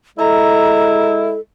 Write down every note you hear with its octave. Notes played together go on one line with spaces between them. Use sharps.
G#3 E4 A4 D#5 A#5